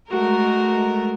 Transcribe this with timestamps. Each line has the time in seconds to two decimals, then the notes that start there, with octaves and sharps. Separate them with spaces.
0.11 G#3 A3 F#4 A#4